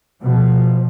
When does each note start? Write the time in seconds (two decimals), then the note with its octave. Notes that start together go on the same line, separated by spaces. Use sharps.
0.22 B2 F3